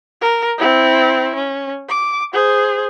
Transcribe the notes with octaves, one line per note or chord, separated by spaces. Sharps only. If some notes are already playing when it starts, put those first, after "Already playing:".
A#4
C4 E4
C#4
D6
G#4 C5